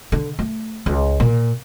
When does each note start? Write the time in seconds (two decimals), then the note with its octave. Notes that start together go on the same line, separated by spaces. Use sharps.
0.12 D3
0.39 A3
0.86 C#2
1.20 A#2